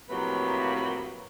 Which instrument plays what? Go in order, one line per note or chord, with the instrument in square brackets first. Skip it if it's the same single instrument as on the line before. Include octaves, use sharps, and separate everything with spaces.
[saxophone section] A2 C3 F3 F#3 A#3 B4